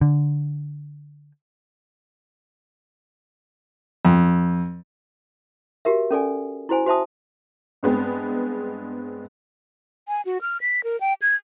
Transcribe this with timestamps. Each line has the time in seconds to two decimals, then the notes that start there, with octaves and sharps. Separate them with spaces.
0.01 D3
4.05 F2
5.85 F#4 G4 A#4 E5
6.11 C#4 A4 D5 G#5
6.69 E4 F#4 C5 G#5
6.86 F#4 C5 E5 A5 D#6
7.83 G2 G#3 B3 C4
10.08 G#5
10.25 F#4
10.41 F6
10.61 B6
10.84 A#4
11.01 G5
11.22 G#6